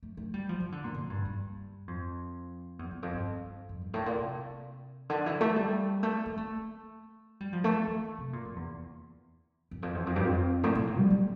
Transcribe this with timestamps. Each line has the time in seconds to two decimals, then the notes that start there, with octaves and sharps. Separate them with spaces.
0.03 A3
0.17 A3
0.34 G3
0.49 F3
0.60 E3
0.72 D3
0.84 A#2
0.94 A#2
1.10 G2
1.25 G2
1.88 F2
2.79 E2
2.91 E2
3.03 F2
3.14 G2
3.69 F2
3.81 G2
3.94 A2
4.06 A#2
4.18 C3
5.10 D3
5.26 E3
5.41 A3
5.56 G3
6.03 A3
6.26 A#3
6.37 A3
7.40 G3
7.53 F3
7.64 A3
7.87 E3
8.18 C3
8.33 A#2
8.45 G2
8.56 E2
9.71 E2
9.83 F2
9.95 E2
10.07 F2
10.16 G2
10.24 F2
10.63 A2
10.75 A#2
10.87 A2
10.98 G3
11.10 A#3